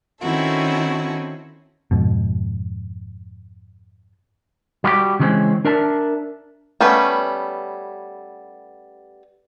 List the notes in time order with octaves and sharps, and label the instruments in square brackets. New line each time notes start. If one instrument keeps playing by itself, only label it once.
[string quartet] D#3 C4 C#4 E4 F#4 A4
[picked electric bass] F2 G#2 B2
[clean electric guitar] G3 F#4 G4
C#3 E3 G3 G#3 C4 C#4
D4 A#4 D5 E5 A5
[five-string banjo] G3 A3 B3 C#4 B4